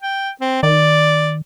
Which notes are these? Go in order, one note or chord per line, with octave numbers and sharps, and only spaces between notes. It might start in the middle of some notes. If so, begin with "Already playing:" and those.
G5
C4
D#3 D5